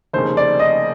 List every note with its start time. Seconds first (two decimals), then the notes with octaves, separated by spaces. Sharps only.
0.13 F1 D#2 C#3 C5
0.37 D5
0.60 D#5